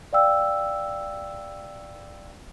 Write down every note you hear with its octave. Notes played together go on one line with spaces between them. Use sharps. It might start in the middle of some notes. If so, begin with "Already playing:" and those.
D5 F5 G5 E6